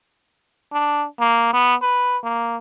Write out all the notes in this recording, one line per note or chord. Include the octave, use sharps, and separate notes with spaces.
D4
A#3
B3
B4
A#3